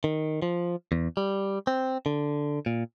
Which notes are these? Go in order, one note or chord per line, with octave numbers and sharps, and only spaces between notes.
D#3
F3
E2
G3
C4
D3
A#2